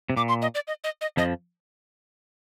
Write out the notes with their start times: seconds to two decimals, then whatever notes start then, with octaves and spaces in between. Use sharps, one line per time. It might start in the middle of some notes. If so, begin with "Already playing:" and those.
0.10 C3
0.17 A#2 D6
0.29 C6
0.42 D#5
0.55 D5
0.68 D#5
0.84 D#5
1.01 D#5
1.17 F2 F3 D#5